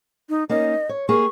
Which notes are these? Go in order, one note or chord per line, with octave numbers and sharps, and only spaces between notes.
D#4
A#3 C#4 D#4 D#5
C#5
A#3 G4 G#4 C#6